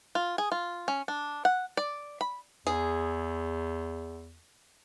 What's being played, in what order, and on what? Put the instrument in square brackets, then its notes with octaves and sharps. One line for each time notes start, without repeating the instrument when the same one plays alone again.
[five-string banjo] F4
G#4
F4
C#4
D4
F#5
D5
B5
[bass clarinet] E2 [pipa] G#4